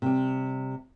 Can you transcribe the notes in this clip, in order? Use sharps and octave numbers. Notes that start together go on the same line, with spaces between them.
C3 G3